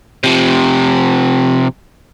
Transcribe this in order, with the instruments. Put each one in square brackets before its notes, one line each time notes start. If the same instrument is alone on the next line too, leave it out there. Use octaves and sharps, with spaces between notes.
[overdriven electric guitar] C3 F3